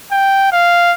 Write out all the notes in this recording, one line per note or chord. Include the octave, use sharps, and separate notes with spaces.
G5
F5